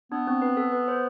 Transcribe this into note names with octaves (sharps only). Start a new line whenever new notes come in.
B3 D4
C4
B4
A4
B4
C5